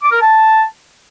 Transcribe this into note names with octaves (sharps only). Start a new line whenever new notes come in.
D6
A#4
A5